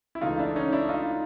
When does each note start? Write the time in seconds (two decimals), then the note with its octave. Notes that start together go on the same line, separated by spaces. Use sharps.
0.15 E4
0.21 C#2 C#3 E3 A3 D#4 F4
0.39 D4 E4
0.56 C#4 D#4
0.72 D4 E4
0.89 D#4 F4